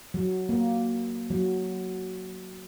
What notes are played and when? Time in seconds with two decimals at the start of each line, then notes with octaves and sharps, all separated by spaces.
0.14 F#3
0.49 A#3
1.30 F#3